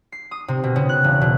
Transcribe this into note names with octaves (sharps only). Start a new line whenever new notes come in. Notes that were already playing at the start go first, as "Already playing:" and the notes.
C7
D#6
C3
B2
C#3
F#6
E1
B2